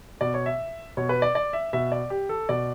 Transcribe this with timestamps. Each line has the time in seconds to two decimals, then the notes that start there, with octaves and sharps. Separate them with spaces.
0.21 B2 D5
0.34 C#5
0.46 E5
0.97 B2 C#5
1.09 B4
1.22 D5
1.35 D5
1.53 E5
1.73 B2 E5
1.92 D5
2.10 G4
2.29 A4
2.49 B2 D5